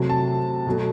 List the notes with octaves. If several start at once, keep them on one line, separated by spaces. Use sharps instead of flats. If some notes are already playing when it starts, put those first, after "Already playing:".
Already playing: C3 F#3 A3
A5
B2 F#3 A3